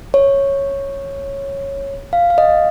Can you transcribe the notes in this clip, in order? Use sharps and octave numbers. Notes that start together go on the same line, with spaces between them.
C#5
F5
F5
D#5